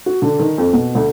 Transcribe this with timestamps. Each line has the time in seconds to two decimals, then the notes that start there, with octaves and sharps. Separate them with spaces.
0.06 F#4
0.22 D3
0.39 D#3
0.58 F2
0.73 B2
0.95 D2